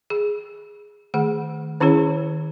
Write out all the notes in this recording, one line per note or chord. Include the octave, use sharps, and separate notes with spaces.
G#4
D#3 A3 G#4 F#5
D#3 C#4 E4 G#4 C#5